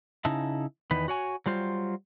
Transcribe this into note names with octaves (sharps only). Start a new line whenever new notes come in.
C#3 D#4 E4 A5
E2 D#3 B3 B4
F#4 C#5 G#5
F#3 G3 F4 C5